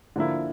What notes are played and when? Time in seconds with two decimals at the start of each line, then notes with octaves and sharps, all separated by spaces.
0.16 D3 F3 A#3 E4